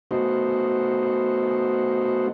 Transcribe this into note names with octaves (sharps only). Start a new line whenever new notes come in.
A3 B3 D#4 F#4 C5